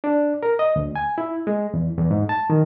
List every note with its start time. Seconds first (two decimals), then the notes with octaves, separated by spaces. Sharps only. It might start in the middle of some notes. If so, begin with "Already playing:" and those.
0.04 D4
0.43 A#4
0.59 D#5
0.76 D2
0.96 G#5
1.18 E4
1.47 G#3
1.74 E2
1.98 E2
2.11 G#2
2.29 A5
2.50 D#3